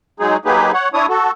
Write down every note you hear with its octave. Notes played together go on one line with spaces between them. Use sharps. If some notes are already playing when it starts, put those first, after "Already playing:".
F#3 G#3 D#4 G#4
F#3 A#3 D#4 G4 G#4 B4
C#5 F#5
D4 E4 C#5 D#6
F#4 A4